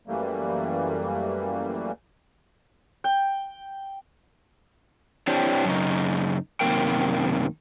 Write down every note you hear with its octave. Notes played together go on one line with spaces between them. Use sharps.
F#2 E3 G3 A3 A#3
G5
C4 D4 E4 G4 C5 C#5
F#2 C#3 D#4
F#2 C3 D#3 A#3 A#4 G5